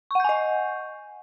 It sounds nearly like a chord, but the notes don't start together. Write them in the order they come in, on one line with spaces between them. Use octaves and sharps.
C#6 F#5 G6 G#5 D#5